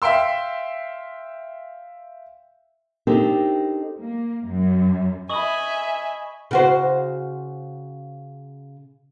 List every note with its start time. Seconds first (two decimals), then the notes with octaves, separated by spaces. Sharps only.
0.02 E5 F5 G5 C6 E6
3.07 C4 D4 D#4 G4 A4 A#4
4.00 A#3
4.46 F#2
5.29 D#5 E5 G#5 B5 C#6 D#6 F#7
6.51 C#3 F#4 C5